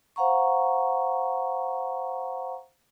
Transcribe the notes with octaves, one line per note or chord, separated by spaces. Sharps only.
C5 F5 F#5 A#5 C#6